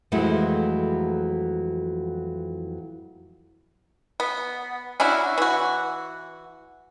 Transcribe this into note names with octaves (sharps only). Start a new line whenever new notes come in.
F2 E3 F#3 G#3 A3 E4
B3
C#4 D4 E4 F#4
E3 F#4